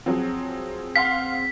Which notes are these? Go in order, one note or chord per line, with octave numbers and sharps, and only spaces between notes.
F3 F#3 C4 G#4
F5 F#5 C6 B6